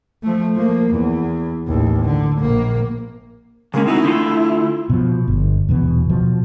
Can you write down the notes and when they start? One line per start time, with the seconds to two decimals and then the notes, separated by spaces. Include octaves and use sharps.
0.23 F3 A3
0.56 F3 A#3
0.89 E2
1.67 A1 D#2
2.05 D3
2.39 A#1 A#3
3.74 C#3 G#3 A#3 C#4
3.86 C4 D#4 E4 F#4
4.04 D3 A3 F4
4.90 B2 F3
5.28 G1
5.69 D#1 E2 B2 B3
6.10 B2 F3